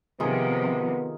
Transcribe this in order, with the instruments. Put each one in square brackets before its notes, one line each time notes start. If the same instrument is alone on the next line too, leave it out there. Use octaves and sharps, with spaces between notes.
[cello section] C3 F3 [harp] D#3 F4 G#4 [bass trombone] B3